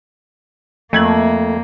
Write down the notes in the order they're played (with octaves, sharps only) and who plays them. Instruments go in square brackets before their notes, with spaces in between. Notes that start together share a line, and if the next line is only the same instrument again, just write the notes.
[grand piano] F2 G#6 F#7 [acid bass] A3 [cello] A#3